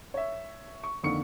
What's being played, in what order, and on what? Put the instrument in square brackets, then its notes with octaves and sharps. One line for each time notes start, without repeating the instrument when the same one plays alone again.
[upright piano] C#5 E5
C#6
F2 D3 D#3 A#3 C#6 C#7